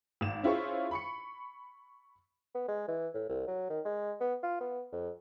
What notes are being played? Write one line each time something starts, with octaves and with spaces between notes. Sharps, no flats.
G#1 E7
C#4 E4 F4 G#4 C5 C#6
B5 C#6 C#7
B3
G#3
E3
A2
C2
F#3
D#3
G#3
B3
F4
B3
F2